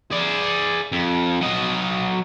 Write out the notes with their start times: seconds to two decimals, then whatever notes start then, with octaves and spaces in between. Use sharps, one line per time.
0.11 G#4 D5
0.92 F2
1.41 F#3 D#5